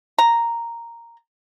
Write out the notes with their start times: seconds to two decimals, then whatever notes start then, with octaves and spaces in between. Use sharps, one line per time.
0.18 A#5